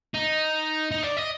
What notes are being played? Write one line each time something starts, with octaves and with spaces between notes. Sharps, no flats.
D#4
D#4
D5
D#5